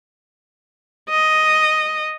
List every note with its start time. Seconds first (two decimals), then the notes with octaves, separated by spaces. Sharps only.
1.09 D#5